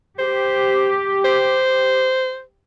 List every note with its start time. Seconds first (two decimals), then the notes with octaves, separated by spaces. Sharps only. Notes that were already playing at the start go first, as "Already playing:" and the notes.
0.19 G4 C5
1.25 C5